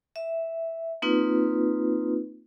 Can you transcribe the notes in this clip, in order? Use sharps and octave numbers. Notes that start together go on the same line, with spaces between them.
E5
A#3 C4 D#4 F4 B4